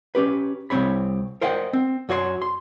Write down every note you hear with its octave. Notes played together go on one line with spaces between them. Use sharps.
C#4 G4 B4
C2 F#2 C4 C#5 B5
A#4 C5 D#5 E5 F#5 G5
C4
F#2 F#4 C#5 D5 C6
C6